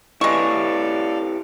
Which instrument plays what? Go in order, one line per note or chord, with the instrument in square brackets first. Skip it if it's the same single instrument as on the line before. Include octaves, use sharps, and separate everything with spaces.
[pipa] G#3 C#6 [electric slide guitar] E4 G4 B4 [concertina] A4 D5 F5